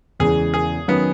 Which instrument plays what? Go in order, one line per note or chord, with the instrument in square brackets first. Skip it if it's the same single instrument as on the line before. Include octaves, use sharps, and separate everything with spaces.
[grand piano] E2 C#3 E3 G#3 [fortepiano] G#4
[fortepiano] G#4
[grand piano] D#3 F#3 C#4 [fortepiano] B3